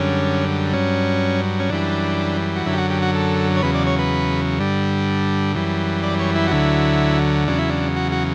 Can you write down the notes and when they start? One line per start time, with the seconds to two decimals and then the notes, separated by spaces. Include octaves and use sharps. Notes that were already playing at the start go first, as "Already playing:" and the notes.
Already playing: F#2 D3 G3 C#4
0.73 G2 F#3 C#4
1.60 C#4
1.70 F#2 E3 G3 D4
2.56 F#4
2.66 F#2 D3 F#3 E4
2.73 G4
2.78 F#4
2.90 G4
3.02 F#4
3.14 A4
3.57 C#5
3.62 E2 C#3 F#3 B4
3.75 D5
3.87 C#5
3.99 B4
4.59 G2 D3 G3
5.55 F#2 E3 G3
6.03 D5
6.19 C#5
6.36 E4
6.48 F#4
6.51 D2 D3 F#3 E4
7.48 E2 C#3 F#3 D4
7.59 E4
7.70 D4
7.96 F#4
8.12 F#4